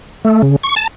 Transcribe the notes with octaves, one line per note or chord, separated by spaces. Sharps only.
A3
C#3
C#6
A5